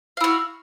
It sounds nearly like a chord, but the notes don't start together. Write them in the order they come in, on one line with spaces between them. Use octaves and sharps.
F5 E4 F#4